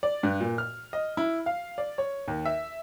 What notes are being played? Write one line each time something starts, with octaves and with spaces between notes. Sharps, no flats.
D5
G2
A#2
F6
D#5
E4
F5
D5
C#5
D#2
E5